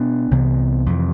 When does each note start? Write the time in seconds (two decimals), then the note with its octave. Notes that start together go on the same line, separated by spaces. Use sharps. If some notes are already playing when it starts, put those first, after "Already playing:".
Already playing: B2 B3 D4
0.31 C2 C3 E3 B3
0.86 F2 C3 E3